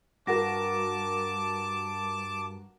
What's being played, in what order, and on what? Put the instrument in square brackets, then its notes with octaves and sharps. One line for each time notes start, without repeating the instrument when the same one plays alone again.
[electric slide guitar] G2 [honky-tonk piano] F#4 A#4 [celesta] F#5 A#6 [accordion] A5 D6